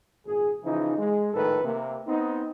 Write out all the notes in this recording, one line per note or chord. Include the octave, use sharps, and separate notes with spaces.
G#1 A#2 G#4
C#3 E3 F3 D#4
G#3
A#1 A2 D#3 A4 B4
C3 A#3
B3 C4 D#4